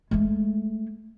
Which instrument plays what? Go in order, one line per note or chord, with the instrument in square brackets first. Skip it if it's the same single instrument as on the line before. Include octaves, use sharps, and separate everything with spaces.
[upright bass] G#3 A3